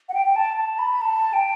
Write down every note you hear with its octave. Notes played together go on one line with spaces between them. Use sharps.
F#5
G5
G5
A5
A5
B5
A5
G5